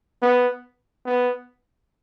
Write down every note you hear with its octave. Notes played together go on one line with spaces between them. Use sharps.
B3
B3